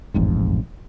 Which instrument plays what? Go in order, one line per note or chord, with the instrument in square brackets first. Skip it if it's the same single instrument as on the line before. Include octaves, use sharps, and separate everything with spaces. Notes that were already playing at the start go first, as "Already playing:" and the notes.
[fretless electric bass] E1 A1 F2 G#2